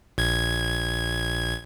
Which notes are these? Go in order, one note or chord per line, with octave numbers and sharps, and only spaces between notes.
A#1 G#6